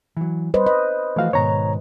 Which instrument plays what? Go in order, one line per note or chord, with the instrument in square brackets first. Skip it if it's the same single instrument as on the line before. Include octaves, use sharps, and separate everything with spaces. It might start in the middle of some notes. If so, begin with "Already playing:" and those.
[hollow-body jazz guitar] E3 F#3
[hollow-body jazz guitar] G3 [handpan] B4 C5 D#5
[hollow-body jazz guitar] B4 [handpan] D#5
[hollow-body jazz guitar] E3 F3 F#4 [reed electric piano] A3 F5
[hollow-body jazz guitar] G#2 B2 D#3 [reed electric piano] C#5 A#5